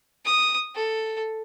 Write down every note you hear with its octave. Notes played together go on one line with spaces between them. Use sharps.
D#6
A4